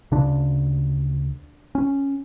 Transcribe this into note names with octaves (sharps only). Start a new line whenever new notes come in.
D2 C#3 D4
C#4